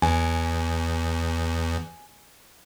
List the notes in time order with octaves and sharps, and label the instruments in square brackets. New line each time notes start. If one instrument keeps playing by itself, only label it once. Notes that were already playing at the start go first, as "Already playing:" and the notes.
[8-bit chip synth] E2 [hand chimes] G#5